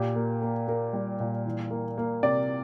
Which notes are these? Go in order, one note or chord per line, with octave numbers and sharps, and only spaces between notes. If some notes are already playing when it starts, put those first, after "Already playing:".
Already playing: A#2 G4
A#3
A#3
A#3 A#4
G3
A#2
E3
A#3
A#3
C3 D5